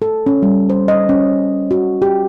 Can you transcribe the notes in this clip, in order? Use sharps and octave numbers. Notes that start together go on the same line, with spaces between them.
A4
C#4
G3
C5
D#5
C#4
F#4
G4